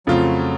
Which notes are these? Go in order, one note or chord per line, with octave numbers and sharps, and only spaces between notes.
F2 C#3 F3 F#3 A3 F4